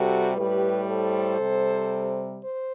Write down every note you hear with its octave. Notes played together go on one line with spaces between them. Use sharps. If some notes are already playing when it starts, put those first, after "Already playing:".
Already playing: C3 G3 F#4 A4
A2 G3 G4 B4
A4 C5
C3 G3
C5